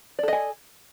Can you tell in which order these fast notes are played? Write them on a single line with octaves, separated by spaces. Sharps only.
D5 A4 D#5 G#5